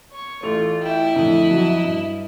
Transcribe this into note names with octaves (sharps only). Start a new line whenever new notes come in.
C#5 C#6
A1 A3 F4 F7
E4 G5
F2 A2 D3 D#5
F2 F#3
G2